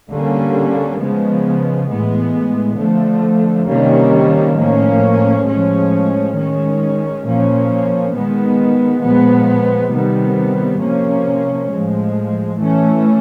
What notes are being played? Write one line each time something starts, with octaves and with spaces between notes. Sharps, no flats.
D3 G3 A#3 C#4
C#3 F3 G#3 B3
A2 E3 G#3 B3
D3 F3 A3
C3 D#3 G3 A#3 C#4
A2 F3 A#3 C#4
A2 F3 G#3 C#4
D#3 G#3 C#4
A#2 F3 A#3 C#4
D#3 G#3 B3
A#2 F3 G#3 B3
C3 D#3 G3 B3
C3 F3 A#3 C#4
A2 F3 G#3
E3 A3 C#4